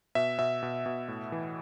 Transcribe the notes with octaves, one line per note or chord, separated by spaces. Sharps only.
B2 E5
B2 E5
B2
B2
A2
E3